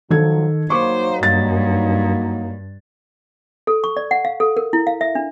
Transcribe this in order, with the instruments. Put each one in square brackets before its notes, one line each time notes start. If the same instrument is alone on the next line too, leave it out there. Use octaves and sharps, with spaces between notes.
[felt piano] D#3 A4 G#6 [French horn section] F3 F#3
[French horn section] F#3 A#3 D#4 [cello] C5 [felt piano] C#6 D6
[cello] G2 [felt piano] A6
[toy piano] A4
C#6
D5
F#5
F5
A4
A#4
E4
F5
E5
D4